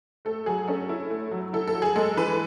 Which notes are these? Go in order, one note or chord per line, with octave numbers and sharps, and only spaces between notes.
A3 A4
F#3 G#4
C#4 A4
E4
A3
F#3
E4 A4
A4
F#3
G#4
G#3 A4
E3 B4